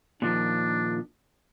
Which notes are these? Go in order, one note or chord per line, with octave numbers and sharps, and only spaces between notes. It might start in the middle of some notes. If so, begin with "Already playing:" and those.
A#2 D#3 F3 D4